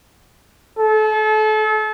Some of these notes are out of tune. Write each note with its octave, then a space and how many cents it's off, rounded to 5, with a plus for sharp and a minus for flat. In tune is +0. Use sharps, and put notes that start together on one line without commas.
A4 -35